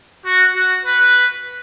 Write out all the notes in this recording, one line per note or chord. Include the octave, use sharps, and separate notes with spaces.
F#4
F#4
B4